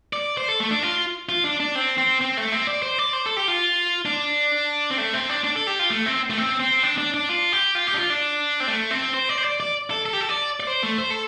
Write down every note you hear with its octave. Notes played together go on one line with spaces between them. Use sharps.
D5
C5
A4
A3
D4
F4
F4
D4
D4
C4
C4
C4
A3
C4
D5
C5
D5
C5
A4
G4
F4
D4
C4
A3
C4
D4
D4
A4
G4
F4
A3
C4
A3
C4
C4
D4
D4
D4
F4
G4
F4
G4
D4
F4
D4
C4
A3
C4
C5
D5
C5
D5
D5
A4
A4
G4
A4
D5
D5
C5
A3
C5
A4